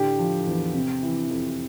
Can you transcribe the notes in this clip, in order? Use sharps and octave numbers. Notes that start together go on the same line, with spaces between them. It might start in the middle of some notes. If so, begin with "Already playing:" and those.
Already playing: A2 D3 G4
F3
E2
C3
E3
F2